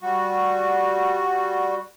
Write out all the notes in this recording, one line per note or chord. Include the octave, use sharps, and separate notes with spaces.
G3 F#4